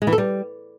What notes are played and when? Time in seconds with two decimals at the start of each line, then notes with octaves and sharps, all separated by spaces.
0.02 G#3
0.07 E3
0.12 A4
0.18 G3